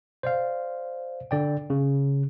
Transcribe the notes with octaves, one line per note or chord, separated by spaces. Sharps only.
C5 D5 F5
D3 D5 G5
C#3